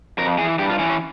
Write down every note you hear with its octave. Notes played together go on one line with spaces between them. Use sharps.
F2 A#4
E3 G#4
G2 G4
F4
E3 C#4
C#4